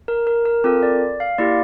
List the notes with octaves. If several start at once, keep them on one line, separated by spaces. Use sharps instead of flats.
A#4
A#4
A#4
C4 F4 A4 A#4
D5
F5
A#3 E4 G4 D5